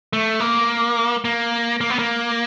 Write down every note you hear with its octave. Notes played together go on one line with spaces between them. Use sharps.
A3
A#3
A#3
A#3
B3
A#3